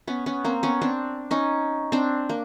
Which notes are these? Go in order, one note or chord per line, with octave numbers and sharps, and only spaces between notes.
B3 C#4
B3 C#4
A#3 C4
B3 C#4
C4 D4
C#4 D#4
C4 D4
A#3